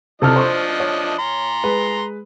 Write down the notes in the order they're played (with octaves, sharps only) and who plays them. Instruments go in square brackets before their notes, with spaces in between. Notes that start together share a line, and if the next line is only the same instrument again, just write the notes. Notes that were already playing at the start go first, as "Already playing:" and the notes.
[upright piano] C3 A4 F6 [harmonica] F3 D4 D#5
[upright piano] C5 C#6
C#5
[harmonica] A#5 C6
[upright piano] G#3 B4